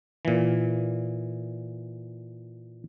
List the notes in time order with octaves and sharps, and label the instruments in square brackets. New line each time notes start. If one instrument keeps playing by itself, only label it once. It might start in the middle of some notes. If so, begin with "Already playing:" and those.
[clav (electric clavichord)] A#2 E3